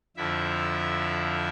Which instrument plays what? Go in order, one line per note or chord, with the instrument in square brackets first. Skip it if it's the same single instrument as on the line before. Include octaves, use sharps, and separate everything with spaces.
[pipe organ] F2 D3 F3 E4 E5